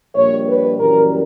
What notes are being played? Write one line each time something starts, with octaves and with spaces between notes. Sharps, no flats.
A#1 A#2 G3 C#5
B4
F#2 E3 G3 A#4